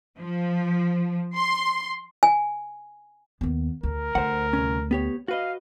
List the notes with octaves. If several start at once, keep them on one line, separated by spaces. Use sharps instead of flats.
F3
C6
G#5
D#2 B3
D2 A#4
D2 C5 F#5
C2 B2 C#4
B3 G4 C#5
F#4 B4 D#5 F5